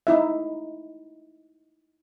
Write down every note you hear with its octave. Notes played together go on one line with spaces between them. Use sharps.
D#4 E4 E5